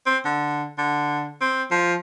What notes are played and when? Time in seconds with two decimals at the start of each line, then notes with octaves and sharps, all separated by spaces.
0.06 C4
0.25 D3
0.78 D3
1.41 C4
1.71 F3